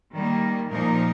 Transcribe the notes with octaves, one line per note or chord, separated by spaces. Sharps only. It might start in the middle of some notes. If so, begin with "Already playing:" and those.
D#3 G3 A#3
A#2 F3 A#3 D#4 A#4